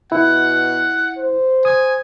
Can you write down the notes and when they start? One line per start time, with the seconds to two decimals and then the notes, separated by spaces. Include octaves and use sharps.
0.12 B2 E4 F#5
1.18 C5
1.65 G#5 D#6